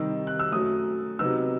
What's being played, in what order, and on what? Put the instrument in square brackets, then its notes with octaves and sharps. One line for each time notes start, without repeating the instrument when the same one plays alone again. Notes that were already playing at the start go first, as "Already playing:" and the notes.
Already playing: [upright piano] C3 D#3 G3 D#4 E6
F#6
E6
F#2 F#3 A3 D#6
C3 F#3 B3 D#4 E6